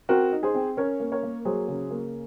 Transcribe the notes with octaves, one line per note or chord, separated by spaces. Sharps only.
C4 F#4 A#4
D#4
G#4 C5
C4
C#4 A#4 C#5
A#3
A#4 C#5
A#3
F#3 G#4 C5
C#3
A#3